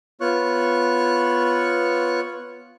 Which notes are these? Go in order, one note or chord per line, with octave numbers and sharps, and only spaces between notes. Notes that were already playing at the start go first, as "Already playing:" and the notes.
B3 F4 C#5 C#6 F#6